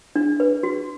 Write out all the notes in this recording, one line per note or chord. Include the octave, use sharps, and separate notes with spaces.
D4
B4
F#4